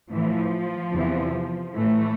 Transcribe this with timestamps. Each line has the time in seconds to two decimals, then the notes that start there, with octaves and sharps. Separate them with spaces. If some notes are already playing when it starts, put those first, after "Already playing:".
0.11 A2 E3 F3
0.92 E2 C3 E3
1.74 A2 E3 A3